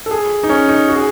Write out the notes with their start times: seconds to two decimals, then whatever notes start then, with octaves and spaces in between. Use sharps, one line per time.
0.06 A4
0.11 G#4
0.43 D#4
0.49 C#4
0.68 D#4
0.88 F#4
0.96 G#4